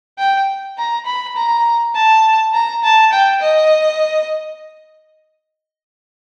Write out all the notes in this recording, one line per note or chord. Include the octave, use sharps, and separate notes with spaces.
G5
A#5
B5
A#5
A5
A#5
A5
G5
D#5